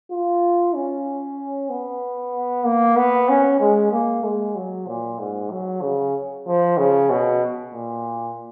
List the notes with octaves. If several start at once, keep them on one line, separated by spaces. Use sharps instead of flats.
F4
C#4
B3
A#3
B3
C#4
G#3
A#3
G#3
F#3
A#2
G#2
F#3
C#3
F3
C#3
B2
A#2